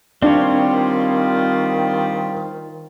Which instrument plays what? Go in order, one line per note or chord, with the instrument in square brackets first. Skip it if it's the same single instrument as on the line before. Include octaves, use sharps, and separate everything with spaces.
[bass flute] D#3 [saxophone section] G3 F4 [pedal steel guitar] C4 C#5 [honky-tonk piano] D4